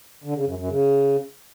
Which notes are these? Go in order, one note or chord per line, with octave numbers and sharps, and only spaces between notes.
D3
C#3
F#2
F#2
C#3